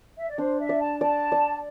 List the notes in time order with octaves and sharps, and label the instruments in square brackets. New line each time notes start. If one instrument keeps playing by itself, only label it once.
[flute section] E5
D5
[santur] D4 [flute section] C5
[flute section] E5
[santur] D5
[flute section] A5
[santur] D5 [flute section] A5
[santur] D5